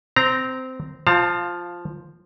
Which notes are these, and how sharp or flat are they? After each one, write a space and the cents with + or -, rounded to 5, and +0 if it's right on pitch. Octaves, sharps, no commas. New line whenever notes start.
C4 -15 A#5 +0
F3 +0 F5 +10 A5 +40